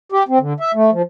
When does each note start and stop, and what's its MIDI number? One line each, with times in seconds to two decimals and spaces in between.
0.12 0.23 67
0.28 0.39 60
0.40 0.53 50
0.60 0.72 76
0.74 0.90 57
0.92 1.02 53